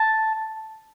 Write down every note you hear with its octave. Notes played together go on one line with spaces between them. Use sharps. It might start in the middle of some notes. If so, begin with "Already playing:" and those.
Already playing: A5